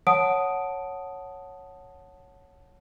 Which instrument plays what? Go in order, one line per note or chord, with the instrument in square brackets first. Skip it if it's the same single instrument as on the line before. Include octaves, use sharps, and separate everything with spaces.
[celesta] C#5 F#5 A5 D#6 D7